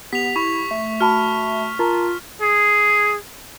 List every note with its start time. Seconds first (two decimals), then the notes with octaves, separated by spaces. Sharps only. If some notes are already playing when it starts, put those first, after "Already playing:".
0.13 B3 G4 B6 F7
0.36 E4 C#6
0.71 A3
1.01 F#4 A5 B5 F6
1.79 F4 A#4 A5 A#5
2.41 G#4